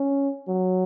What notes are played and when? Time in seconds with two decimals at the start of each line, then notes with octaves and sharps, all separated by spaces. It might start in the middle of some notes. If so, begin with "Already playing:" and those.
Already playing: C#4
0.48 F#3